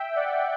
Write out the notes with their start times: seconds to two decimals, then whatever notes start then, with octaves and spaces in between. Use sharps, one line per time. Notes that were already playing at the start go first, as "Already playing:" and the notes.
Already playing: E5 G5
0.16 D5 F#5